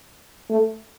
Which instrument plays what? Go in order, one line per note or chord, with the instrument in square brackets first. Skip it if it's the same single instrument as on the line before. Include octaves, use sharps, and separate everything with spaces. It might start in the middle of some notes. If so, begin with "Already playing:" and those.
[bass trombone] A3